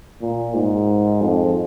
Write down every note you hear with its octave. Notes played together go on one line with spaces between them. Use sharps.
A#2
G#2
F2